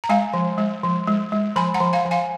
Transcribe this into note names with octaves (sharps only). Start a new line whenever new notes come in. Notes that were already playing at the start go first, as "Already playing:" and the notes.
A#5
G#3 F5 G#5
F3
G#3
F3
G#3
G#3
F3 G#5 B5
F#5 A#5
F3
F5 G#5
F3
F5 G#5